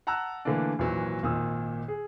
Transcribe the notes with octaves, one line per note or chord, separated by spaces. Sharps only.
F#5 A5 A#5 E6 F#6
D3 E3 A3 A#3 D4
G#1 A#2 E3 F#3
G#1 A#2 D#3 D#6 E6
G#4